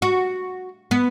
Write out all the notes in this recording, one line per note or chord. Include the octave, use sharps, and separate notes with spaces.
F#4
B3